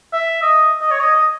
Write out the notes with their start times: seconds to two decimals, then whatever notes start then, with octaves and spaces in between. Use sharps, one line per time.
0.13 E5
0.42 D#5
0.81 D#5
0.91 C#5
1.00 D#5
1.15 D#5